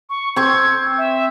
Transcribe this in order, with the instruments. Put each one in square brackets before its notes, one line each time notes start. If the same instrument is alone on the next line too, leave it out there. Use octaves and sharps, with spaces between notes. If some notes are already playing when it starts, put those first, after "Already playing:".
[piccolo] C#6
[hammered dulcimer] C4 C#6 [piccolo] G#6
[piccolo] E5